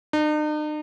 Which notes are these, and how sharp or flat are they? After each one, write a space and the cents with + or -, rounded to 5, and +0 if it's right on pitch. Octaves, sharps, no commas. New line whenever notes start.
D#4 -45